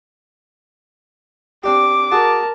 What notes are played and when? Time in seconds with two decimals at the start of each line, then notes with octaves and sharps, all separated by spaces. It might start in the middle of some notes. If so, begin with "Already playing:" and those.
1.64 C4 D4 G4 D6
2.12 F#4 G#4 A#4 A5